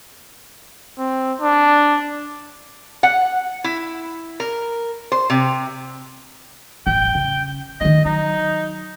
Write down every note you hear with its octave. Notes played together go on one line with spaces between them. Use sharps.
C4
D4
F#5
E4
A#4
C5
C3
E1 A1 G5
C#3
D#3 D#4 D#5
F#3 D#4